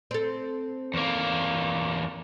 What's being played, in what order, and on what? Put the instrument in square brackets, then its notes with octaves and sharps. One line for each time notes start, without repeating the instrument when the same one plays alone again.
[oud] C4 A4
[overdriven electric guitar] E2 A#3